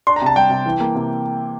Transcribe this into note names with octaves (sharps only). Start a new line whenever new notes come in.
D4 C6
A#5
C3 A5
G3 G5
C3
E3
A#3
C3